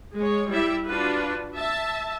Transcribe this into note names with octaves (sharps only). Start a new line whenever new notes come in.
G#3 C#5
G3 E4 G4 E5
D4 F4 F#4 B4
E5 A5